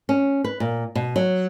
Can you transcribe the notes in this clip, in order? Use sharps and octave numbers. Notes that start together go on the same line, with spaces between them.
C#4
B4
A#2
B2
F#3